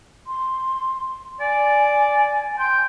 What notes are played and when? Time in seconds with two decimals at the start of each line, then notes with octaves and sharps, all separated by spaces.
0.27 C6
1.40 D5 G#5
2.59 G5 C6